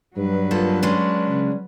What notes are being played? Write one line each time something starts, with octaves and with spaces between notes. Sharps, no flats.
G2 F#3 B4
F3 A#3 A4
G#3 C#4 D4
C#3